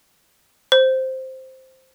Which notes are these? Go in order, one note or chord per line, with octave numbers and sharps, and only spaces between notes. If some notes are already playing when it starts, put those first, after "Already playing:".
C5